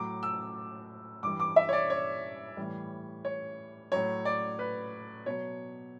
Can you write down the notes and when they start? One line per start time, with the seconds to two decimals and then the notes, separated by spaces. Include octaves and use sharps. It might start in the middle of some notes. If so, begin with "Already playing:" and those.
Already playing: A2 F#3 D6
0.23 E6
1.23 G2 E3 G3 D6
1.40 D6
1.56 E5
1.69 C#5
1.73 D5
1.90 C#5
2.57 A2 E3 G3
3.25 C#5
3.92 A2 F#3 C#5
4.25 D5
4.59 B4
5.26 B2 F#3 C#5